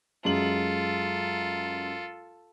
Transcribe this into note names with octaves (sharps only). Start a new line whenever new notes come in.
F#2 G#3 F4 A4 F#7